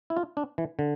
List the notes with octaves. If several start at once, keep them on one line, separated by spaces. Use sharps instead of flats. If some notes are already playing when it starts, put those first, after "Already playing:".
E4
F4
D4
E3
D3